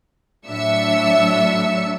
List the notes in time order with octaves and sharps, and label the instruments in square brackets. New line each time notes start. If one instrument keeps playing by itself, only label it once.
[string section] A2 F#3 D4 E5 E6 C#7